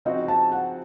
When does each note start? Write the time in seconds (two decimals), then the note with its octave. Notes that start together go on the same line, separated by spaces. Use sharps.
0.05 C#3 F3 C4 D#4 F#4 D#5
0.28 A5
0.52 F#5